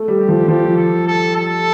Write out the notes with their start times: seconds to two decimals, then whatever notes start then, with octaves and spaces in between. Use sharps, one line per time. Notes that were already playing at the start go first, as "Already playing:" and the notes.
Already playing: A3
0.08 G3
0.19 G4
0.28 F3
0.48 F3 G4
0.77 A4
1.07 A4
1.35 A4